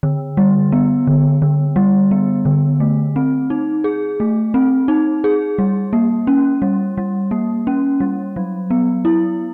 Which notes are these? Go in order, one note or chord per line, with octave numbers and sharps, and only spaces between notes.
D3
G3
B3
D3
D3
G3
B3
D3
A3
C4
D#4
G#4
A3
C4
D#4
G#4
G3
A#3
C#4
G3
G3
A#3
C#4
G3
F#3
B3
E4